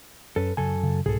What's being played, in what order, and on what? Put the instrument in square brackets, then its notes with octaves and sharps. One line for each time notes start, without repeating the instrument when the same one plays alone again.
[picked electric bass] F#2 C#4 [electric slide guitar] A4 B4
[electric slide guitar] F#2 A4 G#5 [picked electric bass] C#3
[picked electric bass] C#3
[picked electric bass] C2 G#2 B2 [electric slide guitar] G#4 A4